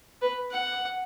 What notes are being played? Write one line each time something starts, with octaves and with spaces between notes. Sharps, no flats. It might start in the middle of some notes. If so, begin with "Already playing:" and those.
B4
F#5